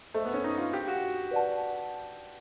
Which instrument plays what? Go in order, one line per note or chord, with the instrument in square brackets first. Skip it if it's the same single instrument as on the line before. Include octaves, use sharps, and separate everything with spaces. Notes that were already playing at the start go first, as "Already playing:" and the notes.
[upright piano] A3 [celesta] A4 C5 D#5
[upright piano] B3
C#4
D#4
F4
G4
F#4
[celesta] B4 D5 F#5 A5